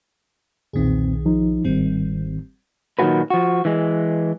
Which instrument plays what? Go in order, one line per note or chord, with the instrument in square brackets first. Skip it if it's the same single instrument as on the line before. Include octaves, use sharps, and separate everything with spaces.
[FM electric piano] B1 D#3 G#4 [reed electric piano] E2 A#2 C4
[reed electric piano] F3 D#4
[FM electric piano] G1 G3 C4 [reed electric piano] G#2 D#3
[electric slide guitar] A#2 D#3 F#3 A3 F#4 B4
F3 F#4
E3 G#3